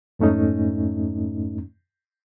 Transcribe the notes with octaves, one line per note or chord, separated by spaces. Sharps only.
F2 G#2 A3 C#4 D#4